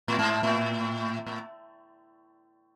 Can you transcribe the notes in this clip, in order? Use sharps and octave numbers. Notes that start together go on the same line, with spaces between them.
A2
G#2
A2
A2